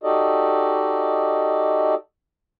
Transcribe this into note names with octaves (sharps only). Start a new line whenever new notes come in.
D#4 F#4 G4 A4 D5 D#5